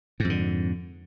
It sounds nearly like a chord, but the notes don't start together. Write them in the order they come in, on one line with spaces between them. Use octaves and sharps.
G#2 F2 D3